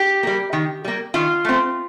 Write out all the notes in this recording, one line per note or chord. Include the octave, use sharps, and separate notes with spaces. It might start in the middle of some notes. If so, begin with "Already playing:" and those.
Already playing: G4
G3 A#3
D#3
G3 A#3
D#3 F4
A3 C4